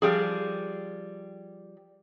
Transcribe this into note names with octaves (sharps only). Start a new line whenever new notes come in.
F3 G3 G#4